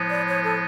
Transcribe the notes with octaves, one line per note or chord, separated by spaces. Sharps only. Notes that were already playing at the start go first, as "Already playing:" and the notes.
Already playing: A2 F3 G#3 B3
D5
C#5
A4